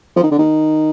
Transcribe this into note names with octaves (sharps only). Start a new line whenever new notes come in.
F3
D#3
D3
D#3